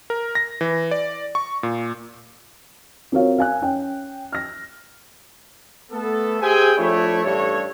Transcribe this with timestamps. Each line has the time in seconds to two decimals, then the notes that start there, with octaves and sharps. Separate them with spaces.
0.10 A#4
0.35 A#6
0.61 E3
0.91 D5
1.35 C#6
1.63 A#2
3.12 C4 F4 F#4 A#4 C#5 F5
3.38 F5 G#5 F#6
3.62 C#4 G5
4.32 F6 A#6
5.91 A3 B3 A4
6.41 G4 G#4 C5 E5 G5 G#5
6.78 F3 A3 D4 E4 C#5
7.24 A1 G2 G3 A4 C#5